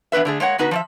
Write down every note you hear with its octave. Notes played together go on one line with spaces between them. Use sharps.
E3 B3 D4 B4 E5
D3 A3 G#4
G#3 A#3 C#5 F#5
D3 B3 D#4 F#4 B4
F3 D5 E5